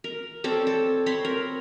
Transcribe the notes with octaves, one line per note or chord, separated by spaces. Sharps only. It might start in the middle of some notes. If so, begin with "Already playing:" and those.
A#4
C4 A4 C#5 D5
A4
C4 C#5 B5 C6
A#4